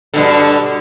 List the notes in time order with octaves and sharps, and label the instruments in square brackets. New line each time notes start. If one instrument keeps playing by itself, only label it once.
[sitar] G2 B2 D3